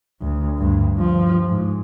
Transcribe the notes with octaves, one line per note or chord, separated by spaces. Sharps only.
D2
D2 G2
G2 F3
G#2